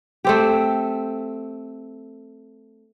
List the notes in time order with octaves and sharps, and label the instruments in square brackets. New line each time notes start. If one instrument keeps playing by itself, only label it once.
[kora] A3 C4 G4